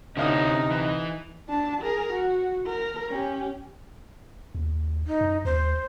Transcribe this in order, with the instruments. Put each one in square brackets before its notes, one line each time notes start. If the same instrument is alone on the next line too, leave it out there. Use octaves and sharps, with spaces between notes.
[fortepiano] D2 F5 D#6 [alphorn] C3 [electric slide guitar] C#4 E4 [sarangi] D#4
[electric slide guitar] E3
[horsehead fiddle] D4 A5
G#4 A#4
F#4
A#4
C#4 G4
[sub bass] D#2
[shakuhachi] D#4
[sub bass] F#2
[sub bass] D#2 [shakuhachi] C5